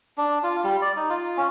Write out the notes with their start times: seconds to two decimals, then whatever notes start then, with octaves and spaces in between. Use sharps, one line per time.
0.18 D4
0.43 F4
0.64 G3
0.82 D5
0.96 D#4
1.10 F4
1.37 C#4